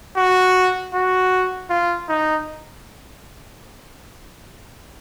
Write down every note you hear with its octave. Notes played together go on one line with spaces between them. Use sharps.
F#4
F#4
F4
D#4